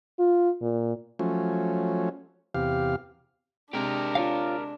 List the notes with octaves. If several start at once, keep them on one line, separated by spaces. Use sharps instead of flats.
F4
A#2
F3 F#3 A3 C#4
E2 C3 G4 F5
C3 G#3 D4 G4 A#4
F4 C#5 F5